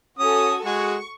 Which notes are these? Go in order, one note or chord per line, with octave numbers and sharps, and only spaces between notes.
C#4 F#4 A4 G#5 D#6
G#3 F#4 G#4 C#6